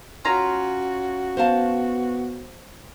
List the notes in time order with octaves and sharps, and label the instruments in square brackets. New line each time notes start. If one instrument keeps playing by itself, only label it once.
[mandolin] C#4 F4 A#5 [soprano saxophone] F#4
[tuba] B3 [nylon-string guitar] C5 F5 A5